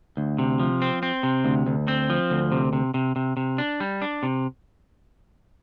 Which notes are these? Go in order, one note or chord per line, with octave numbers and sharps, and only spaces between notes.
D2
C3
F3
C4
C4
C3
D2
D2
C4
F3
D2
C3
C3
C3
C3
C3
D4
G3
D4
C3